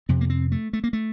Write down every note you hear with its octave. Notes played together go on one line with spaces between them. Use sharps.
F2 C3 C4
A#3
C4
A3
A3
A#3
A3